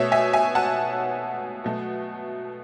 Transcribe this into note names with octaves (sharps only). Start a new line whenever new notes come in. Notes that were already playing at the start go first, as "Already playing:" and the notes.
Already playing: B2 A3 C#5 E5
E5 G#5
E5 G#5
F#5 A5
B2 F#3 A3